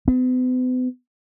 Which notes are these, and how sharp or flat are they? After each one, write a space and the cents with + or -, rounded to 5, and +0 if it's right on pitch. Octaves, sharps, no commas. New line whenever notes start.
B3 +45